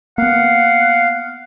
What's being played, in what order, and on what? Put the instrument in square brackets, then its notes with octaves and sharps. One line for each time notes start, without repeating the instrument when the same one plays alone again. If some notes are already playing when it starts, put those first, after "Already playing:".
[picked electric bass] A#3 B3 [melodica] F5 [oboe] F#5